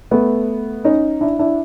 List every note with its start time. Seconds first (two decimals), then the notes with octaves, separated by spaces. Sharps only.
0.11 A3 B3
0.85 C#4 D#4
1.21 D4 E4
1.39 D4 E4